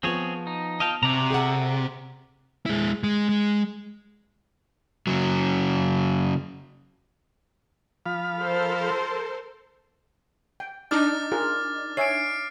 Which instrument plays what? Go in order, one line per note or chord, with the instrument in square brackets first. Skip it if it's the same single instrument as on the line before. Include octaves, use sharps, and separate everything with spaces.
[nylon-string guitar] F3 B3 [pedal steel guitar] C4 G#4 C#5
[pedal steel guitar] D#4
[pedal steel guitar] D#5 F5 G5 [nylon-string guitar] A5
[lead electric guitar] C3 [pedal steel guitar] F#4 D5 A#5
[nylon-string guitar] G#4 A4 F#5
[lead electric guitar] G#3 E4
G#3
G#3
[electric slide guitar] C#3 F#3
[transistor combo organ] F3 F5 B5
[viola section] A4 A#4 C5
[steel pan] G5
[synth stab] D4 D#4 [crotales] D6 F6 A6
[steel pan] F4 G#4 A#4
[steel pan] C#5 E5 G#5 [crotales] C7 D7